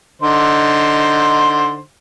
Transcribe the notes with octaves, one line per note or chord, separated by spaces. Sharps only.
D3 D#4 C5